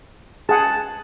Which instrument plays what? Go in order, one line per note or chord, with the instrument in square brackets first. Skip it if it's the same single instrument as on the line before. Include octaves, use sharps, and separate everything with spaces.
[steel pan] G#4 F#5 [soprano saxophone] A5